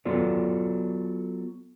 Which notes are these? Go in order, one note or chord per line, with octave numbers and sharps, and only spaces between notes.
F#3 B3 F4 A4 D5